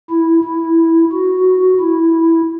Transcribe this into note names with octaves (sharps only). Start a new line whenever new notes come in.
E4
E4
F#4
E4